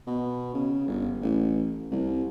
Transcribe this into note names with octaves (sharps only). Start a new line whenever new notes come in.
B2
C#3
G1
A1
C2